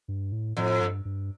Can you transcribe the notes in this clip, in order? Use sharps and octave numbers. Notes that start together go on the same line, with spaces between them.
G2
A2
F2 A2
G2
G2